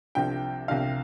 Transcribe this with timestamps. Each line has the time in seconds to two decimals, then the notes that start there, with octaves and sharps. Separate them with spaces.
0.15 C2 C3 F3 D4 G5
0.68 C2 C3 F3 D4 F5